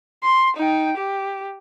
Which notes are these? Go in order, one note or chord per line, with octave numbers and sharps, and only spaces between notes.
C6
D#4 G5
G4